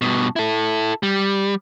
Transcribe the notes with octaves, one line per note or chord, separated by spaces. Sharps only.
G2 B2
E4 A4
G3